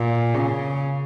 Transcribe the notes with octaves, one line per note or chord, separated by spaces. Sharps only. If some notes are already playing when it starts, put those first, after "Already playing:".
Already playing: A#2
C#3